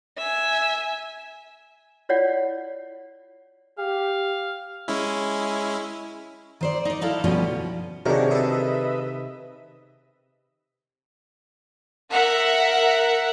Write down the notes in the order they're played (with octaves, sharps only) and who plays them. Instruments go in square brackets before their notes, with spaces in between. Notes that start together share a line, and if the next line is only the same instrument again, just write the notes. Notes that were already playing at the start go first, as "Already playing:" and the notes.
[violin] E5 G#5
[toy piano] E4 F4 C#5 D5 F#5
[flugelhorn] G4 [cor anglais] F5
[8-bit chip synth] G#3 C#4 E4
[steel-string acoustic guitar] D#3 C5 D5
D#4 D5
D#4 E4 A4 F5
D2 B2 F3 G3 B3 C#4
[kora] C3 D#3 [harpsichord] D4 A#4 [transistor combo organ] F#4 G#4 C#5
[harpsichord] G#4 A4 [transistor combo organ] B4 D#5 E5
[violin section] A#4 E5 F#5